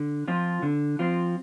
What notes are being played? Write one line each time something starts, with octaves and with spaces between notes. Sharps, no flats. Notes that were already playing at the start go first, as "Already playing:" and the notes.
Already playing: D3
F3 C4 F4
D3
F3 C4 F4